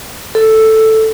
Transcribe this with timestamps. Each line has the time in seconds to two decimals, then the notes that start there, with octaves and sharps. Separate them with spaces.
0.35 A4